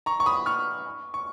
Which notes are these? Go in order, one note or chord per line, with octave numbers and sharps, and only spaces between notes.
A#5 C#6
C#6
B5 D#6
C#6 F6
C#6